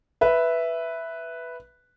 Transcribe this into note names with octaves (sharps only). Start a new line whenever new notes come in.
B4 E5